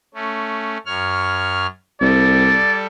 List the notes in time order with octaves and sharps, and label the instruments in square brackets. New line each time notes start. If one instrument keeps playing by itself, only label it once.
[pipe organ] A3 C#4
F#2 C#5 F6
[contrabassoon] C2 [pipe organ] G3 A4 [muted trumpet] D5